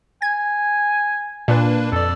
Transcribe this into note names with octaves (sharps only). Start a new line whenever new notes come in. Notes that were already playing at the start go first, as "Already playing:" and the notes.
G#5 G#6
A#2 A#3 D4 B4
F2 A4 D5